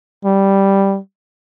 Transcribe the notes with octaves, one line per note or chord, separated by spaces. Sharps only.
G3